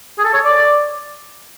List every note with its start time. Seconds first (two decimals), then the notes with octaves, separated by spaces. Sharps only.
0.18 G#4
0.24 A4
0.34 C#5
0.45 D5